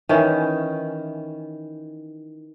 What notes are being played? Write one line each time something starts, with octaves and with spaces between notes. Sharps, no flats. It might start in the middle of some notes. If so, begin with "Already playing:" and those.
D#3 E3 C#4